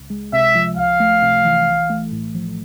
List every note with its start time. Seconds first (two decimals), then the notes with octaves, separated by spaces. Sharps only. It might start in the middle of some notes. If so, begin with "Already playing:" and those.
Already playing: C#2
0.10 G#3
0.33 C3 E5
0.55 F3
0.77 C#2 F5
1.00 A3
1.22 C3
1.45 E3
1.67 B1
1.90 A3
2.12 A2
2.35 F3